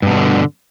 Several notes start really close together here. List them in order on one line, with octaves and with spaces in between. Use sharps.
G2 B2 D#3 D3